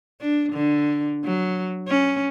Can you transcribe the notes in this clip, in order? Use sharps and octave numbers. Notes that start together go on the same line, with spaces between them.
D4
D3
F#3
C#4